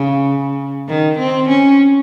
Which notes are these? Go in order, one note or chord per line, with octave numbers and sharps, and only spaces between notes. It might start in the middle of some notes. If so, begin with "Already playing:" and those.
Already playing: C#3
D#3
C4
C#4